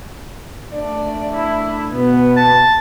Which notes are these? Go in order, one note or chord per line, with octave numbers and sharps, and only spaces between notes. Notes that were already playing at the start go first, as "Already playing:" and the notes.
A3 D4 D5
E4
B2 B3
A5